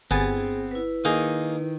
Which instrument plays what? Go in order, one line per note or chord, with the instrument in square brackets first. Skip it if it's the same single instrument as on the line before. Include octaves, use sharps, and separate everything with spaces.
[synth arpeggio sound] G1 G#5 A6 [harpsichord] B3 [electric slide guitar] C4 [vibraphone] G#4
[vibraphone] E4 B4
[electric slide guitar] D#3 [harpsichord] A#3 D#4 G#4